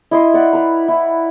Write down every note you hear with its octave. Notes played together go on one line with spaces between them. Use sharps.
E4 D#5 C6
D5 F#5
B4 A#5
E4